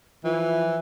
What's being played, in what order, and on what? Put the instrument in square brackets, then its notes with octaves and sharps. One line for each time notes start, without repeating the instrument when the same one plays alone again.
[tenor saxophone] E3 [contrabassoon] F3